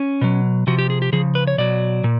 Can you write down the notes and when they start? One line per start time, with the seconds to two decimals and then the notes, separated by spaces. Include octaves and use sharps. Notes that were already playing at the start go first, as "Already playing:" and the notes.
Already playing: C#4
0.21 B2 F#3
0.67 C3 F3 F#4
0.79 G4
0.90 G#4
1.02 G4
1.12 C#3 F3 G#4
1.35 B4
1.47 C#5
1.58 B2 F#3 D5
2.04 A#2